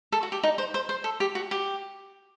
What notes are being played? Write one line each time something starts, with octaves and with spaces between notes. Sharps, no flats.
A4
F#4
G4
D#4
C5
C5
C5
A4
G4
F#4
G4